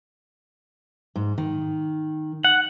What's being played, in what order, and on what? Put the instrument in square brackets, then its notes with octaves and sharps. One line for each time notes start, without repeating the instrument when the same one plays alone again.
[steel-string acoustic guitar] G#2
D#3
[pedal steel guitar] F#5